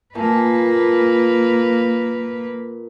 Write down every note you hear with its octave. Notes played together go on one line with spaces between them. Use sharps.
A#2 A#3 B4 G#5 A5